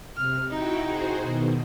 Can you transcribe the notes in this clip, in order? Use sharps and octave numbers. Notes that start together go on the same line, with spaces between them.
C3 F6
D#4 E4 F#4 G5
F#4 G#4 C5
B2 D#3